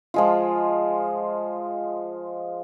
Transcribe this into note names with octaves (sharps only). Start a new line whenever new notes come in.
F3 G#3 F4